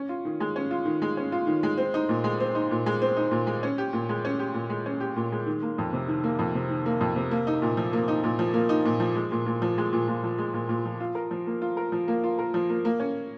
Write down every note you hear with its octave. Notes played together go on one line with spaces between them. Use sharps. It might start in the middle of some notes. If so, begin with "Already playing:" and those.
Already playing: C#4
F4
D#3
G#3
C#4
F4
D#3
G#3
C#4
F4
D#3
G#3
C4
D#4
A#2
G#3
C4
D#4
A#2
G#3
C4
D#4
A#2
G#3
C#4
G4
A#2
G#3
C#4
G4
A#2
G#3
C#4
G4
A#2
G#3
D#3
A#3
F2
C3
D#3
A#3
F2
C3
D#3
A#3
F2
C3
A#3
D#4
A#2
F3
A#3
D#4
A#2
F3
A#3
D#4
A#2
F3
G#3
A#2
A#2
F3
G#3
A#2
A#2
F3
G#3
A#2
A#2
F3
F4
A#4
F3
A#3
F4
A#4
F3
A#3
F4
A#4
F3
A#3
A#3
C#4